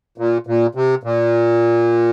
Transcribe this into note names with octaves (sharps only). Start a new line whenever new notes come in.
A#2
A#2
C3
A#2